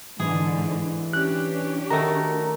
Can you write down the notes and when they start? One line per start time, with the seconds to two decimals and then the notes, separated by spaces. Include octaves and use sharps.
0.20 G#2 D3 E3 G#4
1.13 C#4 D4 G4 F#6
1.90 D#3 A3 F#4 A#5